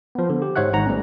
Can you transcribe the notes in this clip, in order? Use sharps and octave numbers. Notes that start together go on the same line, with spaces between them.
F3 B3
D3
G4
G#2 C5 C#5 E5 F#5 F#6
G#1 G#2 F#5 A#5
G3 A3 B3 C#4